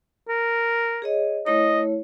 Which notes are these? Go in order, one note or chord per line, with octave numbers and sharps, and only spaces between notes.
A#4
G#4 C#5 D#5
A3 E4 C#5 D#5